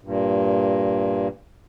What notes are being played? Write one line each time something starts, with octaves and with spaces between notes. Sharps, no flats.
G2 A#2